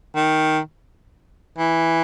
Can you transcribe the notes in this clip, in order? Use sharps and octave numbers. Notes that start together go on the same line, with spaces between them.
D#3
E3